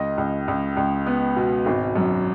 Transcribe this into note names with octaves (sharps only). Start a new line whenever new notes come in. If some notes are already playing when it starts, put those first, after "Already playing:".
Already playing: C#2 D#5
C#2
C#2
C#2
B3
B2
G#1
F#2